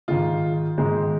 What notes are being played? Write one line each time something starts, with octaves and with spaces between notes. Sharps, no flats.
G#2 D#3 G#3 F4
G#2 D#3 G#3